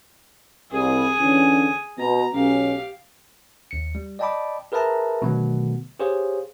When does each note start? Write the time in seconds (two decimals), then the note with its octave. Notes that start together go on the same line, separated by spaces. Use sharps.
0.72 C2 G#4 G#5
1.19 E2 D3 C#4
1.99 B2 A#5
2.33 B1 C#4 G4 F5
3.71 D#2 C#7
3.95 G3
4.19 D5 D#5 G5 A5 B5 D6
4.72 G#4 A#4 B4 E5 A5 A#5
5.22 B2 D3 D#3 F#3 A3 B3
6.00 G4 G#4 C5 C#5 F5